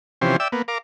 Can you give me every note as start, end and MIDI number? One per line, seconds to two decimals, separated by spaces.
0.21 0.36 48
0.21 0.36 52
0.21 0.36 53
0.21 0.36 61
0.21 0.36 67
0.21 0.36 72
0.40 0.48 74
0.40 0.48 76
0.40 0.48 79
0.40 0.48 88
0.52 0.62 58
0.52 0.62 59
0.68 0.78 70
0.68 0.78 77
0.68 0.78 86